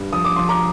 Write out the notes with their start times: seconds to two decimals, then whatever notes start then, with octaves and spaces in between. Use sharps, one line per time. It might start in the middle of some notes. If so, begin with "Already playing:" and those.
Already playing: G2
0.13 F3 D#6
0.25 D6
0.36 F3 C6
0.49 A#5 D6